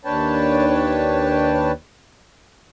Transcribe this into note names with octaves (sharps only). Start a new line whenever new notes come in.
D#2 D4 B4 C#5 G5 A5